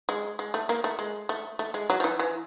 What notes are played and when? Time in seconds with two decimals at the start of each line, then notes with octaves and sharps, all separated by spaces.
0.09 G#3
0.39 G#3
0.54 A3
0.69 A#3
0.84 A3
0.99 G#3
1.29 A3
1.59 A3
1.74 G#3
1.90 F#3
2.00 F3
2.04 E3
2.19 E3